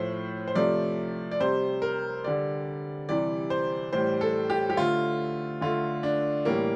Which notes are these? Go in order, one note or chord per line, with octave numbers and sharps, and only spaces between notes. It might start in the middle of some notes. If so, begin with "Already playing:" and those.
Already playing: A2 F3 A3 C5
C5
C3 F3 A3 D5
D5
C3 G3 C5
A#4
D3 G3 D5
C3 E3 G3 D5
C5
A2 E3 G3 C5
A4
G4
G4
D3 A3 F4
D3 A3 F4
D4
A2 E3 G3 A#3